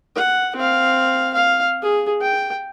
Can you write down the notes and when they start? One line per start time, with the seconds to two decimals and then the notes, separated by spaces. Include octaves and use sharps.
0.15 F#5
0.56 C4 F5
1.34 F5
1.82 G#4
2.21 G5